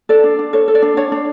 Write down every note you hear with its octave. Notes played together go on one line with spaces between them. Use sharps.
A4 D5
D4
D4
A4 C#5
A4
D5
D4
D4 C#5
D4